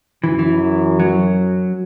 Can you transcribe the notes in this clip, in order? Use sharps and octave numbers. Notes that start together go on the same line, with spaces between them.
F#2 E3
E3
F#3